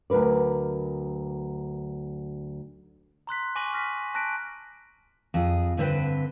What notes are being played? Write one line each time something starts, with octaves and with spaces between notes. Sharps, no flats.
D2 F#3 A#4 B4 D5
A#5 C6 F#6 B6
G#5 C#6 D6 A#6 D#7 F#7
F6 A#6 B6
A5 F#6 A#6 B6 D7
F2 G#4
G2 D3 C4 A4 B4 G5